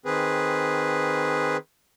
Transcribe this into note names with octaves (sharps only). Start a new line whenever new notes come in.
D#3 C4 G#4 B4